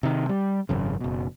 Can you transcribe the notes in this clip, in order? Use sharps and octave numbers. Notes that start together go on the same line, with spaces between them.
C3 D#3
G3
G#1 F#2 C#3
F#1 B2